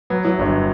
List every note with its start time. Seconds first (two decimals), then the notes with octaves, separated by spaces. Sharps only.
0.10 F#3 B4
0.24 F#3 E4
0.39 G1 D4